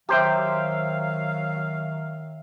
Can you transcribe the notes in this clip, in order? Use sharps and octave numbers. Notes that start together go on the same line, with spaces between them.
D#3 F#3 G4 C5 E5 F5 G5 A#5